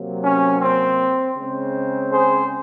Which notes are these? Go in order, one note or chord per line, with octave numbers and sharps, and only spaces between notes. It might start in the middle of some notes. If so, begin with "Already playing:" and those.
Already playing: C3 F#3 A#3
C#4
C4
C#3 G#3 C4
G#4 C5